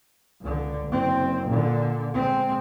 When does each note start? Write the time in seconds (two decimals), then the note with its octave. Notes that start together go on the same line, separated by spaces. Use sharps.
0.41 C#2 D3
0.88 F#1 C4
1.47 A#2 D3
2.14 G#3 C4